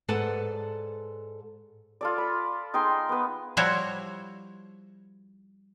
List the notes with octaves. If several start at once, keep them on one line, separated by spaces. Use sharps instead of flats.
G#2 A4 B4 D5 F#5 A5
F4 A4 D5
B5
D#4 G#4 G5 C6
B3 B4
F3 G3 E4 F#4 C5 C#5